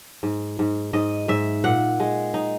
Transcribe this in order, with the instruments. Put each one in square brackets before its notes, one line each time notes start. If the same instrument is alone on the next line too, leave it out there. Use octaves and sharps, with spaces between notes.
[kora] G#2
G#2
G#2 D#5
G#2 E5
A#2 F#5
G#3
D#4